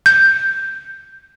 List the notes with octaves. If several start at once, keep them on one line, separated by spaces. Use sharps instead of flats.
G6